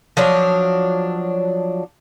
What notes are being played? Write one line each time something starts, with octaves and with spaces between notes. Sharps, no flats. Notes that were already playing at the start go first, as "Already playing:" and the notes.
F3 F#3 D4 C#5